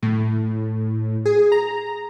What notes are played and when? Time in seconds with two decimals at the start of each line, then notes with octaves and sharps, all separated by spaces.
0.02 A2
1.25 G#4
1.52 A#5